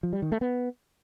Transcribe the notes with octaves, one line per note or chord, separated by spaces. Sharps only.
F3
G3
D#3
A3
B3